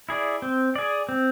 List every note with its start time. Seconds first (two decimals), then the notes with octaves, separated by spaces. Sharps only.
0.09 E4 G#4 D5
0.42 C4
0.76 G#4 D5
1.09 C4